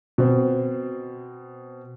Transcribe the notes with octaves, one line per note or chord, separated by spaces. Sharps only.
B2 C4